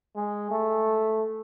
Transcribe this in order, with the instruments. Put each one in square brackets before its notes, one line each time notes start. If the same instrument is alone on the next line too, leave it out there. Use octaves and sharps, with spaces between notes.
[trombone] G#3
A3